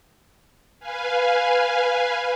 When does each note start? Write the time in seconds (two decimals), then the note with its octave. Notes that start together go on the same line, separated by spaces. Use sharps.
0.80 B4 F5 G#5